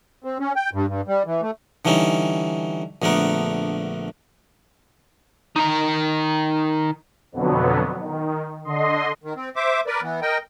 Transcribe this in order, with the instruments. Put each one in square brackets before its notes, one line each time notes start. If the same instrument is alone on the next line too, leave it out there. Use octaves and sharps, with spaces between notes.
[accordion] C4
C#4
G5
G2
G2
G3
E3
A3
[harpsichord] D3 E3 G3 C#4 D#4
A#1 D3 A3 B3 A#4
[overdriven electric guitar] D#3 A#4
[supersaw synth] F2 B2 D3 F#3 B3
D#3
D3 D#5 C6
[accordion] D#3
C4
C5 E5 D6
A#4 B4 D5
E3 B3
A#4 D#5 G5